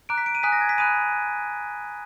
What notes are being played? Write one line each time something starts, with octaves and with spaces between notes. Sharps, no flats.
A#5 D6 F#6 D7
B6
D7
D#7
G#5 D#6 F#6 B6
A#6
G#6
B6
G#5 B5 D#6 F#6 D#7